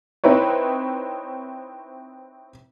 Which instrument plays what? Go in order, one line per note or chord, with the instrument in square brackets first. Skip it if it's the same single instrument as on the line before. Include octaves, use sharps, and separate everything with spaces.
[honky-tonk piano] C4 D#4 E4 B4 C#5